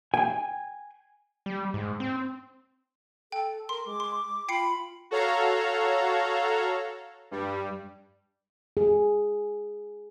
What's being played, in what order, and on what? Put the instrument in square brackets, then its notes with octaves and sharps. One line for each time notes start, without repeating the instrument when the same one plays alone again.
[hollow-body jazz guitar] G5 G#5
[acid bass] G3
G#2
C4
[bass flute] A4 [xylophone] G5
[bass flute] A#4 [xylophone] C6
[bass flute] G#3 [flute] D6
[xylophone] C6
[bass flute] F4 [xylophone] G5 C7 C#7 [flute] B5
[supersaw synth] F#4 A4 C#5 F5 A#5
G2 G3
[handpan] G#4